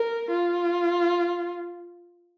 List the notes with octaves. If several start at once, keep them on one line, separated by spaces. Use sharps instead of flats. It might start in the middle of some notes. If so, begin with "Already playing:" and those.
Already playing: A#4
F4